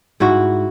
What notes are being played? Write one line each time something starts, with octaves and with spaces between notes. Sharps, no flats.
G#2 E4 F#4